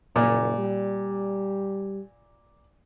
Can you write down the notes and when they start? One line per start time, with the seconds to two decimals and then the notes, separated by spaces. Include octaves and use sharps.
0.16 F#1 A#2
0.58 G3